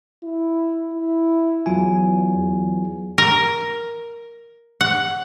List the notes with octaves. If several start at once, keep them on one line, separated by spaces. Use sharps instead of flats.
E4
E4
E2 F#3 F4 G#5
E2
A#4
F#5